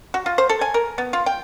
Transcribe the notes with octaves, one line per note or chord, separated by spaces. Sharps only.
F#4
F4
C5
A4
G#5
A#4
B3
F4
G5